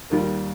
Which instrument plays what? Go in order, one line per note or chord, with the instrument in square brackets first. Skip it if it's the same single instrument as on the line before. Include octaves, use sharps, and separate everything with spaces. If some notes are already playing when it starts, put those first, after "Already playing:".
[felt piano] D#2 D#3 G3 F4 A#4